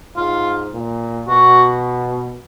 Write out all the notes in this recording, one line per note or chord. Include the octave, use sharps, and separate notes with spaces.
G#2 F4
A#2
B2 F#4